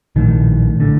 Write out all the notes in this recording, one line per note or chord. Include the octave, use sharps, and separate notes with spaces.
A#1 A2 D#3
A2 D3